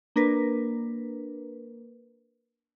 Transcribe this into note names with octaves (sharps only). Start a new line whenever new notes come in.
A#3 D4 A#4 B4